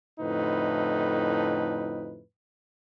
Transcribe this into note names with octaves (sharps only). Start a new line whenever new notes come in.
F2 A2 D3 D#4 E4 B4